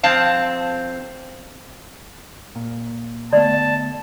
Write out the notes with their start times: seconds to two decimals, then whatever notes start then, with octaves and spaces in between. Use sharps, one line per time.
0.03 F2 C4 F5 A5
2.56 A#2
3.33 D3 A3 B3 D5 A5